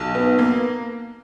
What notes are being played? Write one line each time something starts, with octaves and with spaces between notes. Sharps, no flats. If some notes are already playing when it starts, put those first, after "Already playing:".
Already playing: B1
B3
A#3